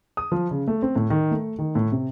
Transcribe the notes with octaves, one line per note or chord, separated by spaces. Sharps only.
D#6
F3
C#3
A3
C4
A2
D#3
A3
D#3
A2
C3